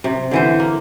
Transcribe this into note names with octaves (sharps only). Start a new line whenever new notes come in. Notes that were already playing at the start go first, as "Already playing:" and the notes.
C3
D3 E3 C5
A#3